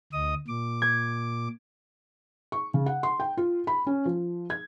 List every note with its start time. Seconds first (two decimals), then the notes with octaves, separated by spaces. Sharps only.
0.13 D2 D#5 D#6
0.48 A#2 D6
0.82 G#6
2.52 C#6
2.74 C#3
2.86 F#5
3.03 C6
3.20 G5
3.37 F4
3.67 B5
3.87 C#4
4.05 F3
4.50 G#6